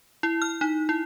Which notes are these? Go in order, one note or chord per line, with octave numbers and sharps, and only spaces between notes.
E4
F6
D#4
E4